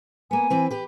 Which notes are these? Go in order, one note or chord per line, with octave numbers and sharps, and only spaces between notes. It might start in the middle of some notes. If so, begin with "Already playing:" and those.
A#3 B3 G#5
E3 C4 B4
G4 B4